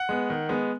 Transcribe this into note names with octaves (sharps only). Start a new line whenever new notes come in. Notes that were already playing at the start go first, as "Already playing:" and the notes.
Already playing: F#5
G#3 B3
D#3
G#3 B3